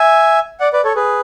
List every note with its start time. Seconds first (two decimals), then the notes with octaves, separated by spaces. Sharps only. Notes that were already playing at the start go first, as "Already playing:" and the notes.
Already playing: E5 G#5
0.60 D5 F#5
0.73 B4 D5
0.85 A4 C#5
0.96 G#4 B4